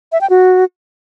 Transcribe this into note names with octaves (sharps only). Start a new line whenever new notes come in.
E5
G5
F#4